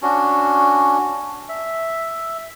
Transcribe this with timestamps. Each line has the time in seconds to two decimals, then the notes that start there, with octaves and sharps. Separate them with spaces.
0.02 C#4 D4 F#4
1.49 E5